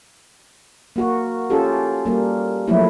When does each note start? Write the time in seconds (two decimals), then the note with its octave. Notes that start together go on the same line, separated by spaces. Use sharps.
0.96 A#3 F#4
1.50 C#4 F4 G4 A4
2.05 G3 A#3
2.68 F3 F#3 A3 A#3 E4